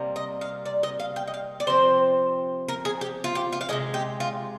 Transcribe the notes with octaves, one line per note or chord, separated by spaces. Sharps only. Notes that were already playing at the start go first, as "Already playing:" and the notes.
Already playing: C3 G3 A#3
D#5
F5
D5
D#5
F5
G5
D#5
F5
D5
C3 F3 C4 C5
A#4
G#4
G4
F4
G4
F4
F5
C3 D#3 G#3 D#5
G4
F4